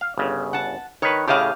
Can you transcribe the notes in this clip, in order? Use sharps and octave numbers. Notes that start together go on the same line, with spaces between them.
F5
G1 C#3
F#5 A5
D#3 B4 C#5
A2 C#3 G4 D#5 F5